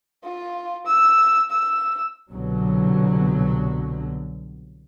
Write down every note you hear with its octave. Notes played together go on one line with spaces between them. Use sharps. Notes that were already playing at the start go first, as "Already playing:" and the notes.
F4
E6
E6
C2 B2 D3 F#3